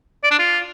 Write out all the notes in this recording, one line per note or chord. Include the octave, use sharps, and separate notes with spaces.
D5
D4
F4